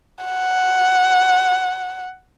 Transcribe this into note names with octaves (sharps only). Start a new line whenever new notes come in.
F#5